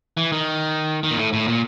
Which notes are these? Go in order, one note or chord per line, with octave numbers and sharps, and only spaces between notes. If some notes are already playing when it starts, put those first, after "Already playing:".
E3
D#3
D#3
A#2
A2
A2
A#2